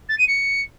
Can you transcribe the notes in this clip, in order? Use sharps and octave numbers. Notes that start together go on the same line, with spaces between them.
A6
D#7
C#7